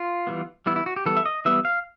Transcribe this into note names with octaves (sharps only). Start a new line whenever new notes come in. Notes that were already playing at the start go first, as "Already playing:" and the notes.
Already playing: F4
E3 G3 B3
E3 G3 B3 E4
E4
F#4
G4
E3 G3 B3 A4
E5
D#5
E3 G3 B3 E5
F5